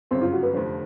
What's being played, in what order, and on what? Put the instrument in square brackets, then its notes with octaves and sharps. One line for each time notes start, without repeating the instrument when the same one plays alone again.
[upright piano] G1 F#2 C#3 [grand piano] C4
[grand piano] F4
F#4
B4
[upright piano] F1 F2 D3 [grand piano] C5